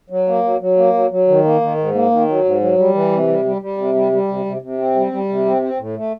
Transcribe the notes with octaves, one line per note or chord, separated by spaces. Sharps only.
F#3
A#3
F#3
F#3
A#3
F#3
F#3
D#3
A#3
D#3
G#2
A#3
D#3
F#3
G#2
F#3
G3
E3
C3
G3
G3
G3
C3
G3
G3
C3
C3
C3
C4
G3
G3
C3
C4
C4
A2
A3